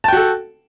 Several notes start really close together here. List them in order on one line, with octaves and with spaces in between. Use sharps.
A5 G5 F#4 A4